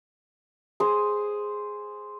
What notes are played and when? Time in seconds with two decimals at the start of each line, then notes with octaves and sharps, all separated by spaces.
0.80 G#4 C5